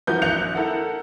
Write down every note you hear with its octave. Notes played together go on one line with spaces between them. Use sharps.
E3 F3 F#4 A#4 B4 G6
A#1 F5 F#6 G6 C#7 F7
E4 A4 A#4 F#5